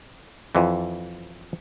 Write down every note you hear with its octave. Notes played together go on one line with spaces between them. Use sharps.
F2 E3